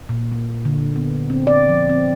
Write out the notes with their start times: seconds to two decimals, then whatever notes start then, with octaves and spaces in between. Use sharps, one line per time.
0.09 A#2
0.32 A#3
0.65 D3
0.96 B3
1.30 C4
1.47 D5
1.69 F3
1.89 C4